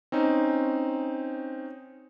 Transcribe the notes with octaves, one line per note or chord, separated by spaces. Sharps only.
C4 C#4 D#4